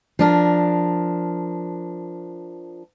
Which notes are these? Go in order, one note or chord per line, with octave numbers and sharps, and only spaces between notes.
F3 D4 A#4